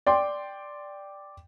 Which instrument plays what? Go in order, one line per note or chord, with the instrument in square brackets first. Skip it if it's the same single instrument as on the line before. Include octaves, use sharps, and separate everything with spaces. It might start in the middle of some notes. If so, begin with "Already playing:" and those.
[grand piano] D5 G5 C6